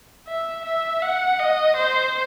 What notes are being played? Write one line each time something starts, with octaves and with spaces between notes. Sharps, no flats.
E5
E5
F#5
D#5
C5